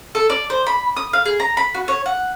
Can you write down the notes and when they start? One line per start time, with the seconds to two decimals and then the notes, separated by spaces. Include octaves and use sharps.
0.15 A4
0.30 D5
0.50 C5
0.67 B5
0.97 D#6
1.13 F5
1.25 G#4
1.40 A#5
1.57 B5
1.74 F#4
1.88 C#5
2.06 F#5